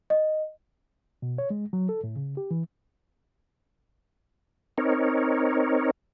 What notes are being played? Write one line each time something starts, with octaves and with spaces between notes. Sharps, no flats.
D#5
B2
C#5
G#3
F#3
A4
A2
C#3
G4
E3
C4 D#4 A#4 C#5